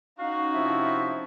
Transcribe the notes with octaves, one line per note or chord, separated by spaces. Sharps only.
C#4 D#4 F#4 F5
C3 F3 E4 E5